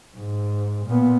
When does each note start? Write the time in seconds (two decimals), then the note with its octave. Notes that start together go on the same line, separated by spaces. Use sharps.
0.17 G#2
0.86 A#2 B3